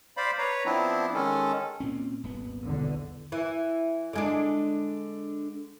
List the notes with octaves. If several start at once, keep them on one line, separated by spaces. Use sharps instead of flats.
C5 D5 F5 B5
B4 C#5 A#5
F3 B3 C4 D4 E4
D#3 G#3 C#4 A4
A#2 C4 C#4
D#1 G#1 B3
B1 E2 D3
E3
D3 G#3 D4